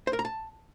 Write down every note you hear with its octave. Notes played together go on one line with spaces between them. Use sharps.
C5
A#4
A#5
A5